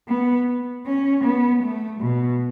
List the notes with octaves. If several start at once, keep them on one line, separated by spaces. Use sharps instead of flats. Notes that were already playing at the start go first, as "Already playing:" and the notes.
B3
C#4
B3
A3
B2